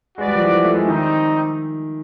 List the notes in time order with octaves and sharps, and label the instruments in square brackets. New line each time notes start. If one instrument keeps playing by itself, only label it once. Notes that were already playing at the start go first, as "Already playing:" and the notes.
[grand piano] G#3 [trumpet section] F#4 B4 D5
[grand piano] G3
F3
E3
F3
A3
G#3
[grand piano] D#3 [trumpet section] G3 C4 D#4